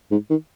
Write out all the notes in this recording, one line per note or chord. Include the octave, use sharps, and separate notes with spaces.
G#2
D#3